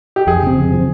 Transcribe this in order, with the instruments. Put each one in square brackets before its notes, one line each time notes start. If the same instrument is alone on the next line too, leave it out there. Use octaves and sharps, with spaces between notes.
[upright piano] G4
[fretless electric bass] F2 [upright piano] G#4
[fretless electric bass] C#3 F3 C4
F2
C#3 F3 C4